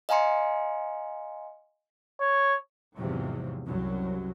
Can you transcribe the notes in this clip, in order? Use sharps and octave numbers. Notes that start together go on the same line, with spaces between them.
D#5 F5 G#5 A#5 C6 C#7
C#5
E2 G#2 C3 F3 F#3
C2 F#2 F#3